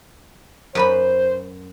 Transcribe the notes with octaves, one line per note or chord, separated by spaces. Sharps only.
F#2 B4 C5 B5